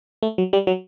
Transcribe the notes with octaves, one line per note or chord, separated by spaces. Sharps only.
A3
F#3
G3
F#3